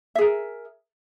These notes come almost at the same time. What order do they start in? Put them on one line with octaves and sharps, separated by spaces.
E5 G#4 A#4